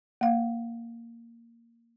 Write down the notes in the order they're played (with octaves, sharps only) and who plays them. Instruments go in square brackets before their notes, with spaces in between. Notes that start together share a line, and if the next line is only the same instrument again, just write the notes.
[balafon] A#3 F5